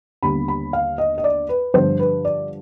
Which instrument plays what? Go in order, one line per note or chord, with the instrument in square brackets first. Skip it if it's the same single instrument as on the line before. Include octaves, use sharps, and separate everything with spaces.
[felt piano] D#2 D3 G3 B3 B5
B5
F5
D#5
D#5
D5
B4
G2 D3 F3 C5
B4
D5